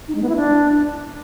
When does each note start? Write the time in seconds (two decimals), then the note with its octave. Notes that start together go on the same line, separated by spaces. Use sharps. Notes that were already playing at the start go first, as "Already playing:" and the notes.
0.08 D#4
0.15 G#3
0.22 B3
0.29 E4
0.36 D4